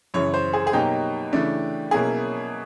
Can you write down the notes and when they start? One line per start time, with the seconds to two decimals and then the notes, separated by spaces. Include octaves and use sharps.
0.14 F#2 C#3 E3 C#5
0.34 C5
0.53 G#4
0.67 G#4
0.73 B2 F#3 A#3 D#4 G4
1.33 C#3 E3 A3 D4
1.91 B2 F#3 A#3 C#4 E4 G#4